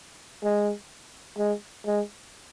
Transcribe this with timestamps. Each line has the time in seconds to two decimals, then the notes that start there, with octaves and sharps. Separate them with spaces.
0.43 G#3
1.38 G#3
1.86 G#3